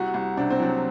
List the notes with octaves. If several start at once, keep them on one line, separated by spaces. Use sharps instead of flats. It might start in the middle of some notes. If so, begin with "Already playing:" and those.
Already playing: C2 F#4
C2
C3 D4
C4
F#3 D4